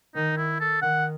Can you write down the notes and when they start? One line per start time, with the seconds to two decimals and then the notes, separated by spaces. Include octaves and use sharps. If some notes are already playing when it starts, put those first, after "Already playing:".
0.15 D#3 D#4
0.37 E4
0.60 A4
0.82 D#3 F#5